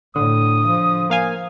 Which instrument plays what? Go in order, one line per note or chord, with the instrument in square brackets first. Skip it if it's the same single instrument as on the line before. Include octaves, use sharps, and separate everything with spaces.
[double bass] A2 [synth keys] D3 [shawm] D#6
[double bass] F3
[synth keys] A#3 F5 G#5